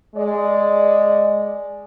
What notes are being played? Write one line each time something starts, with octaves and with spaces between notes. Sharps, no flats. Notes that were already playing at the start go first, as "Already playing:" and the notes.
G#3 D5